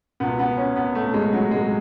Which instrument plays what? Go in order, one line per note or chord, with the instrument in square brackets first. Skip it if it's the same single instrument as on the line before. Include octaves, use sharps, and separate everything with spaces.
[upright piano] C#2 B2 B3
B3
C#4
B3
A3
G#3
F#3
G#3